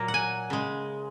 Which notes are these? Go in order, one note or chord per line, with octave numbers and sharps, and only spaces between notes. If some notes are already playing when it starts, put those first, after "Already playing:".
Already playing: A#2 F#3 A#3 A#5
F#5
G#5
C#3 G#3